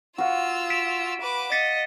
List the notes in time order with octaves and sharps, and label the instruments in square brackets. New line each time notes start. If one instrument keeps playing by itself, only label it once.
[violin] F4 E6 [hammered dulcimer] F#4 F5
[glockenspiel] B6 D7 E7
[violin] B4 D6
[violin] D#5 [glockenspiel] A6 B6 C#7